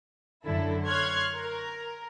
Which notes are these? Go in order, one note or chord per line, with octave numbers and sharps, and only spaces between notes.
F#2 D3 F#3 E4 A4
C#5 C6 F6 F#6 G#6
A#4